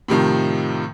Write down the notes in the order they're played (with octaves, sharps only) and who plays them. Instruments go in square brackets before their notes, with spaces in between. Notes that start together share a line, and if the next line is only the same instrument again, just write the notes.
[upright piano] A2 C3 D#3 F3